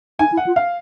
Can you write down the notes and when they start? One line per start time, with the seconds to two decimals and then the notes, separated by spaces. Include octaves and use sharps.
0.19 D#4 G#5
0.32 E4
0.37 F#5
0.47 F4
0.56 F5